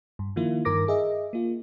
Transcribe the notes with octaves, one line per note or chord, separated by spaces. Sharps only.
G2
D#3 F3 A#3 E4 F4
G2 D#3 A#4 D6 A#6
G#4 D#5 E5
A#3 F4